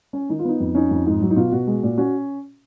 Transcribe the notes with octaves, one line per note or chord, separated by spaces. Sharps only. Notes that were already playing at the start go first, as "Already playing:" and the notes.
C#4
D#3 D#4
F4
B3 D#4
F2
C#4 D#4
F2
G#2
F#3
D#4
B2 F4
B2 F#4
G#3
A#2
C#4 F#4